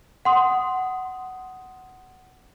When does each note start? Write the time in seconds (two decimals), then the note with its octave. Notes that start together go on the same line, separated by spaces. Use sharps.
0.25 F#5 C6 D#6